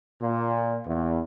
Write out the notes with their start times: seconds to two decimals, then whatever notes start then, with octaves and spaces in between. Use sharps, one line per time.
0.22 A#2
0.86 E2